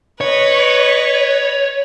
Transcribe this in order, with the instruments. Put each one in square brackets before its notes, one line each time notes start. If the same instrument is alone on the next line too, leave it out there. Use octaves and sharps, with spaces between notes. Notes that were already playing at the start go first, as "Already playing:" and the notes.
[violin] B4 D#5 [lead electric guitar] C#5